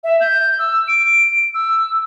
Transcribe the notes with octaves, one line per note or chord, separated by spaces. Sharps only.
E5
G6
E6
D7
E6